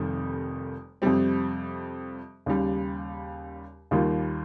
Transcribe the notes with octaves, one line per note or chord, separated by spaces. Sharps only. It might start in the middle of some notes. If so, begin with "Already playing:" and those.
Already playing: F1 F2 D#3 G3
F2 C3 G3 C4
D#2 C#3 G3
D#2 D#3 G3 A#3 F4